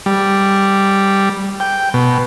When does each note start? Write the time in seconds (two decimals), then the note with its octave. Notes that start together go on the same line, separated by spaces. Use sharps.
0.06 G3
1.60 G5
1.94 B2